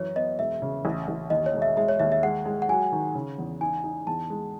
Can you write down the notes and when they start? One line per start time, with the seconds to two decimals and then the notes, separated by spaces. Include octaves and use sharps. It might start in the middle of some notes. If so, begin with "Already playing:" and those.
Already playing: F#2 E3 C#5
0.16 B3 D#5
0.39 E1 E5
0.62 C#3
0.85 A1
1.08 A1
1.30 D#2 D#5
1.46 C#5
1.54 E1
1.62 E5
1.77 G#3 E5
1.88 C#5
2.00 D#2 E5
2.12 E5
2.23 G#3 F#5
2.45 G#3
2.62 F#5
2.69 F#3 G#5
2.92 D#3
3.15 C#3
3.38 E2
3.61 D#4 G#5
3.84 D#4
4.07 E2 A5
4.30 G#3